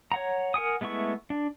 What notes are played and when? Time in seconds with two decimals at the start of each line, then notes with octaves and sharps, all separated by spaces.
0.12 C#5 F#5 A#5
0.54 A#4 F#5 G#5 D#6
0.81 G#3 A3 B3 E4 C#6
1.30 D4